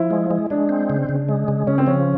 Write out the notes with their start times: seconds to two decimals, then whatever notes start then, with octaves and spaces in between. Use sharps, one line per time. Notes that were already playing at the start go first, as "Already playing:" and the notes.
Already playing: F3 E4
0.11 G#3
0.31 G#3
0.50 G#3 D4
0.69 C4
0.90 C#3
1.09 C#3
1.29 G#3
1.48 C#3
1.67 C#3 C#4
1.78 C4
1.87 F3 C#4